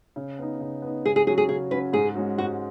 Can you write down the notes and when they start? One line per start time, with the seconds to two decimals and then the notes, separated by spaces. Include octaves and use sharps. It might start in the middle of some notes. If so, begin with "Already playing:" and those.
0.16 C#3
0.38 B3 D#4
0.60 C#3
0.82 B3 D#4
1.05 C#3 G#4
1.16 G#4
1.27 F#3 C#4 F#4 G#4
1.38 G#4
1.49 C#3 G#4
1.71 F#3 C#4 F#4 B4
1.93 G#2 G#4
2.15 G#3 C#4 F#4
2.38 G#2 F#4